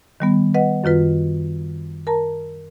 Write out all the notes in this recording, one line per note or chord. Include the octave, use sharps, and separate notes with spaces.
D#3 G3 B3
B4 D#5 F#5
F#2 D#3 F4 B4
A#4 A5 A#5